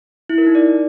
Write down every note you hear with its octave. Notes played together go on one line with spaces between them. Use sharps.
E4
A#4
D#4
D5